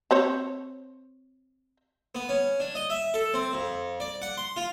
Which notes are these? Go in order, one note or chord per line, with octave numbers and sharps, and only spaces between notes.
C4 C5 C#5
B3
C#4
D4
D#5
E5
A4
C4
F2
D5
F#5
C6
F4